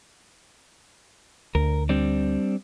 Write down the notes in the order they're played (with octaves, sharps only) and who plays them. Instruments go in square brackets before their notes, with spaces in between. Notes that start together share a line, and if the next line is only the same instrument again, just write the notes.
[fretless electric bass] D2 [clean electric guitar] A#4
[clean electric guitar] G3 C4 D4